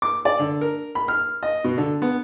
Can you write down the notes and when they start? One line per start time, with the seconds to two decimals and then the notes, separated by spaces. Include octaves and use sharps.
0.02 D6
0.25 D5
0.39 D3
0.61 A#4
0.95 B5
1.08 F6
1.43 D#5
1.64 B2
1.78 D3
2.02 B3